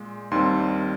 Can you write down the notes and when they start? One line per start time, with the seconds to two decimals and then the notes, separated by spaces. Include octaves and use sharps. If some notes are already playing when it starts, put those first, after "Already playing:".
Already playing: A#2 G#3
0.31 D#2 D#3 G3 C4 C6